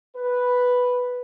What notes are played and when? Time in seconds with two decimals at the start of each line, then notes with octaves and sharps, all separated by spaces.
0.15 B4